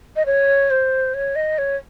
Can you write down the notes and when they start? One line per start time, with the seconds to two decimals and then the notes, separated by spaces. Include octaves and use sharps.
0.16 D#5
0.26 C#5
0.70 C5
1.14 C#5
1.35 D#5
1.58 C#5